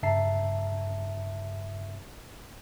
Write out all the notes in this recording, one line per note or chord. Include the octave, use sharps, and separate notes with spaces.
G2 C#3 E5 A5 A#5 C7